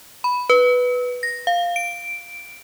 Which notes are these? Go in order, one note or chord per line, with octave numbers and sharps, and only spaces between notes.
B5
B4
A#6
F5
D7